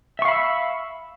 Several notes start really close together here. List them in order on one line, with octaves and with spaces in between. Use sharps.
E5 C#6 F5 B5 E6